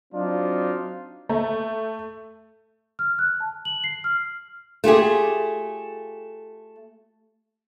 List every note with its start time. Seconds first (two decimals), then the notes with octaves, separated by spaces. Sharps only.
0.13 F#3 C4 D4 D#4 F4
1.29 A3
2.99 F6
3.19 F#6
3.40 A5
3.65 F#7
3.84 C7
4.04 F6
4.84 A3 F4 G4 G#4